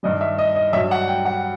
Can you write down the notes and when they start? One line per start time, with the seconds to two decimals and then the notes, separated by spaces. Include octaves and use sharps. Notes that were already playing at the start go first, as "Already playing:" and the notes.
0.03 G2 D#3 G3 D#5
0.21 E5
0.39 D#5
0.56 D#5
0.73 G2 F#3 E5
0.91 F#5
1.08 G5
1.25 F#5